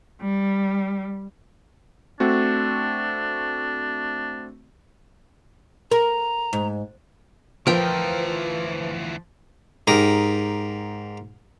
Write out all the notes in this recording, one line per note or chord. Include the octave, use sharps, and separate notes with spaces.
G3
A3 C4 D4 F#4
A#4 A#5
G#2
D2 E3 F3 A#4 B4 G5
G#2 G4 A#4 D#6